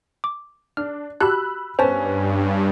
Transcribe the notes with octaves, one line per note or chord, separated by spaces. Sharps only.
D6
D4 F6
F#4 G4 A5 B5 E6 F#6
G2 B3 C#4 C5 A5